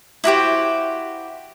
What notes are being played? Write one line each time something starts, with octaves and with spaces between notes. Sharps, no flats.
E4 F#4 G4 C5